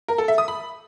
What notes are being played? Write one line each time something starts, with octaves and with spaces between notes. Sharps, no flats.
A#4
A4
E5
D#6
B5